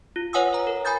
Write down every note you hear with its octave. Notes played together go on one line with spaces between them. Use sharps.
F4
B4 C#5 F#5 G#5 D#6 E6
C#5 A#5
A#4
G#5 B5 D#6 G6 A6